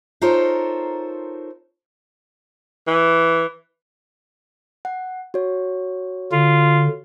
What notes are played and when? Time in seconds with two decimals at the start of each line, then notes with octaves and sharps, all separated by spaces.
0.21 D#4 F4 A4 A#4 C5 C#5
2.87 E3
4.85 F#5
5.34 F#4 C#5
6.32 D3 F4